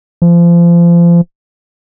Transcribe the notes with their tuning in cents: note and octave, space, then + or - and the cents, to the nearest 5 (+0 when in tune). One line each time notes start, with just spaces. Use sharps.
F3 -30